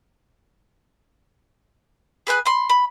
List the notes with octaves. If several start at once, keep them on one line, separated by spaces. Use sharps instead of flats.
G#4 B4 G#5 F#6
B5 C6
B5